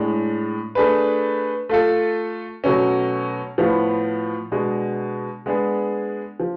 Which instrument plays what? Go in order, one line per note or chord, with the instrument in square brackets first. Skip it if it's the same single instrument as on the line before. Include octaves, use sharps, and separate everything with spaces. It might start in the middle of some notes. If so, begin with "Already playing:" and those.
Already playing: [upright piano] A2 G#3 D4
A3 D4 G#4 B4
A3 F4 A4
B2 F#3 A3 C#4
A2 F3 B3 F4
B2 G#3 D4
G#3 B3 D4 G#4
F3